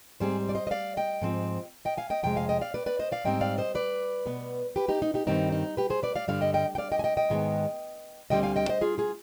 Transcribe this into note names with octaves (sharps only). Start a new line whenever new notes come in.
G#2 G3 C4 G#4 C5
D5
C5 D#5
D#5
D5 F5
D#5 G5
G#2 F3 C4
D#5 G5
F5 G#5
D#5 G5
F2 C3 G#3 G5
F5 G#5
D#5 G5
D5 F5
B4 D5
B4 D5
C5 D#5
D5 F5
G#2 G3 C4 D#5 G5
D5 F5
C5 D#5
B4 D5
B2 B3
G4 B4
D#4 G4
D#4
D#4 G4
G2 D#3 G3 C4 D#4
D#4
G4 B4
G#4 C5
B4 D5
D5 F5
G2 D3 G3 D5 F5
D#5 G5
D#5 G5
G5
D5 F5
D#5 G5
G#5
D#5 G5
D#5 G5
G#2 D#3 G#3 B3
D2 D3 G3 C4 D#5 G5
F5 G#5
D#5 G5
C5 D#5
F4 G#4
F4 G#4